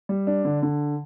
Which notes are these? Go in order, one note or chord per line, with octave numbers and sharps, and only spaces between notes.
G3
D4
D3
D3